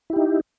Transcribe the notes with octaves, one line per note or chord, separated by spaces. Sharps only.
D#4 E4 G4